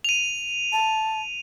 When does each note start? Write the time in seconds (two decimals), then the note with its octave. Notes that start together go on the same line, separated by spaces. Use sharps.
0.04 D#7 F7
0.72 A5